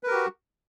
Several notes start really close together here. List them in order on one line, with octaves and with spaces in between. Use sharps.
B4 A#4 G4 F#4